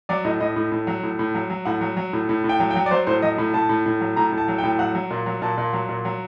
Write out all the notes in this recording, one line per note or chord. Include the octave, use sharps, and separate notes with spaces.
F#3 D5
A2 D#5
A2 D#5
A2
A2
F#3
A2
A2
F#3
F#3
A2 F#5
F#3
F#3
A2
A2
A2
G5
F#3
G5
F#3
D5
F#3 C5
A2 C5
F#3 D#5
A2
A2 A5
A2
A2
F#3
A2 A#5
A2
A5
F#3
G5
A2
F#3 F#5
F#3
A#2
F#3
A#2 A5
A#2
F#3
A#2
F#3